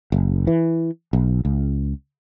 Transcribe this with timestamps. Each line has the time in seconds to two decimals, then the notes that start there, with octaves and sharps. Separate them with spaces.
0.12 F#1
0.47 E3
1.13 B1
1.45 C#2